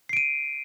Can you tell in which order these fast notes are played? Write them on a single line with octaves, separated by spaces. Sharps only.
C7 D7 D#7